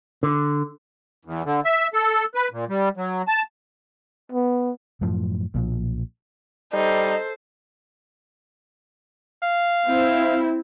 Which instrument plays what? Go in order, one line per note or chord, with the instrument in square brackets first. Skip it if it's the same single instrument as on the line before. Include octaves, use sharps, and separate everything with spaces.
[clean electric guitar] D3
[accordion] E2
D3
E5
A4
B4
A#2
G3
F#3
A5
[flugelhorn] B3
[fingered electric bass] F#2 A2 F3
B1 A#2 F3
[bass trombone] G3 [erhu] D#4 [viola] A4 C5
[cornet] F5
[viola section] C4 E4